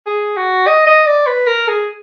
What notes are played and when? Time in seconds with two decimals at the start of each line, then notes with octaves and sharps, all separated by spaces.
0.06 G#4
0.36 F#4
0.67 D#5
0.87 D#5
1.07 D5
1.26 B4
1.47 A#4
1.68 G#4